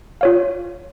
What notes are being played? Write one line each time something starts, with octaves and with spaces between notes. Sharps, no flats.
F4 C#5 F5